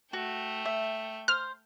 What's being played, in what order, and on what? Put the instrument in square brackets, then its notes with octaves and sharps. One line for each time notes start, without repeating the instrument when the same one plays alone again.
[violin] A3 G5 [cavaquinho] F#4
[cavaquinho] E5
[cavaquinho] C5 [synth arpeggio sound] F6